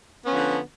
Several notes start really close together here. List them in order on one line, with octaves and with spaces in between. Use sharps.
B3 C#4 D3 F3